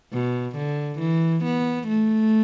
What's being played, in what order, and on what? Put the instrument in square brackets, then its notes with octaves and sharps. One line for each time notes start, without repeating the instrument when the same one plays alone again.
[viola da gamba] B2
D3
E3
B3
A3